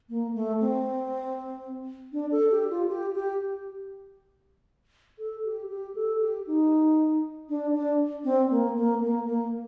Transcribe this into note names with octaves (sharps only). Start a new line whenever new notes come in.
A#3
A3
C4
D4
A4
G4
F4
G4
G4
A4
G4
G4
A4
G4
D#4
D4
D4
C4
A#3
A#3
A#3
A#3